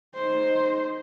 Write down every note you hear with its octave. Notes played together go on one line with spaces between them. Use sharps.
D#4 C5